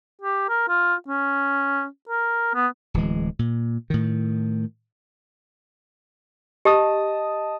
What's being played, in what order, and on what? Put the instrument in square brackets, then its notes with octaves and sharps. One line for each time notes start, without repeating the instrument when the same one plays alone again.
[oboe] G4
A#4
F4
C#4
A#4
B3
[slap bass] D1 E3 G#3
A#2
A2 D#3
[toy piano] G4 [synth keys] D#5 A5 D#6